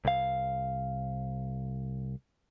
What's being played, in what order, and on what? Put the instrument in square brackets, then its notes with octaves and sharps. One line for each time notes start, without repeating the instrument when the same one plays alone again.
[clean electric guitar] C2 F5